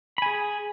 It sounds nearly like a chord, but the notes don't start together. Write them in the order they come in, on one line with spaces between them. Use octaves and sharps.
B5 G#5 G#4